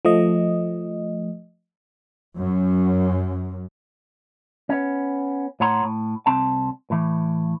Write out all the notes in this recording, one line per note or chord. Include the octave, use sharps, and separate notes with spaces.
F3 A3 D#5
F#2
B3 C#4
A2 C#5 F#5 A#5 C6
A2
C2 C4 A5
A2 E3